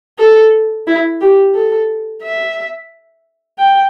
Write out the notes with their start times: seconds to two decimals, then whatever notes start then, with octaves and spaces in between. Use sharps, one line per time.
0.19 A4
0.87 E4
1.21 G4
1.55 A4
2.23 E5
3.58 G5